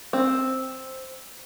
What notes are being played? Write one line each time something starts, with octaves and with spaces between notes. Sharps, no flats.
C4